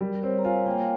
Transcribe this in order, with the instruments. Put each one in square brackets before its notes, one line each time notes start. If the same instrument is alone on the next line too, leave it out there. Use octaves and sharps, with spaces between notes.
[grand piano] G3 [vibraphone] A#4
[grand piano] C4 [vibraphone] C#5
[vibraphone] A#5
[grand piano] F4 [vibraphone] G#5
[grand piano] A#3 [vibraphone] G5